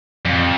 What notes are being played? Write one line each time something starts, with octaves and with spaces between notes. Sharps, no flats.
F2